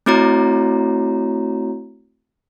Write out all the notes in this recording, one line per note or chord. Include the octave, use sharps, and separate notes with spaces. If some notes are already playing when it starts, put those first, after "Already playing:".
A3 C4 E4 F#4 C#5 A#5